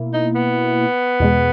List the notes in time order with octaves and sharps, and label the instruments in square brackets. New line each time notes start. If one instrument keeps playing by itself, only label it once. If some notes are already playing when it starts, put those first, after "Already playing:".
Already playing: [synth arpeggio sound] B2 A#3 E4
[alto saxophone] D#4
B3
[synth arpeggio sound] E2 B2 G#3